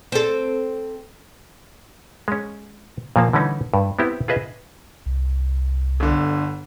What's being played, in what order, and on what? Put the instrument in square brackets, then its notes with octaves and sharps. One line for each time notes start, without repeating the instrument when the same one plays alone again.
[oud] C4 A4
[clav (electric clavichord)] G#3 C#4
A#2 F3 A#3 A5
D3 E3 G3 C#4 D#4
G2
B3 C4 E4 G4
F4 G#4 B4 D#5 E5
[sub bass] C2
[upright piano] G1 D3